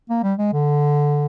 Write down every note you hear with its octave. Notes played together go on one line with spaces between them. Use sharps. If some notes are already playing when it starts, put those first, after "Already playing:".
A#3
G3
G#3
D3